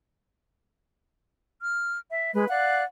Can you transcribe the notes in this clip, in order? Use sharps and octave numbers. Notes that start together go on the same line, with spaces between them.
F6
E5
G#3 B4
D5 F5 F#5 F#6